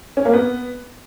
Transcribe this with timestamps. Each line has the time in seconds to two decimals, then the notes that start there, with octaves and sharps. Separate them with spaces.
0.17 C#4
0.25 A#3
0.34 B3